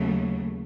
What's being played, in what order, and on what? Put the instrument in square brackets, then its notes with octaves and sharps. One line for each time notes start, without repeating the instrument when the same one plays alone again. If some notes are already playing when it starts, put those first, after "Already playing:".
Already playing: [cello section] D#2 C#3 F#3 A3